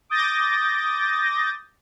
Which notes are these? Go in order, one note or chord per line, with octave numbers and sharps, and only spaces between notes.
D6 D#6 G6 A6 A#6